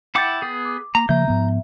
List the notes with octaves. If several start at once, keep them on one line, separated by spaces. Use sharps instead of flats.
E4 F#5 G5 D6 G6 A6
B3 G#4
D6
A#3 A#5
C#3 F3 A#3 E5 A#5 G6
G#2 F3 B3